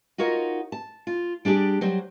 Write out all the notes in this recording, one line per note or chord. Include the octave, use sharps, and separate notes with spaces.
D#4 F4 F#4 A#4 C#5
A5
F4
G3 D4 G4 G#4
F#3 G3 C5